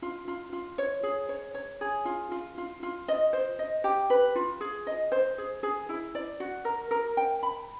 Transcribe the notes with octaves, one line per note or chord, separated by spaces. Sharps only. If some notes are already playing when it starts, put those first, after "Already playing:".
F4
F4
F4
C#5
G#4
C#5
C#5
G#4
F4
F4
F4
F4
D#5
C5
D#5
G4
B4
F4
G#4
D#5
C5
G#4
G#4
E4
D5
F#4
A#4
A#4
G5
B5